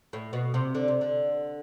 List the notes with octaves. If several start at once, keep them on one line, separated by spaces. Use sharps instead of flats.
A2
B2
C3
D3
C3
D3